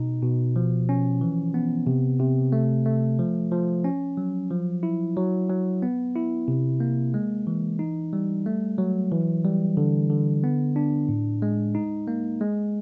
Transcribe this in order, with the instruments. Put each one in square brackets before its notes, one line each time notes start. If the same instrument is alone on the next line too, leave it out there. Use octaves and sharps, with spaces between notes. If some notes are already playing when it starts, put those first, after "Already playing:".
Already playing: [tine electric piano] B2 D#4
B2
F3
C#4
E3
B3
C3
C3
A3
A3
F3
F3
C#4
F#3
F3
E4
F#3
F#3
B3
E4
C3
A#3
G#3
E3
D#4
G3
A3
F#3
E3
G3
D3
D3
B3
D4
A2
G#3
D#4
A#3
G#3